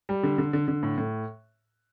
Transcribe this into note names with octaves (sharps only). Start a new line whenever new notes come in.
G3
D3
D3
D3
D3
A2
A2